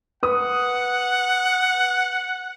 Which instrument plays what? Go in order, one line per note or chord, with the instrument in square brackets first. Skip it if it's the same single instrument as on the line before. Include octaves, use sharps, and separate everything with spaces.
[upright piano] B4 D#6 [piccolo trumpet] F#5